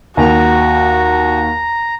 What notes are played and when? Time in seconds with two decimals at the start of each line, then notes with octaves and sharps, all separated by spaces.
0.17 D#2 F#4 A#5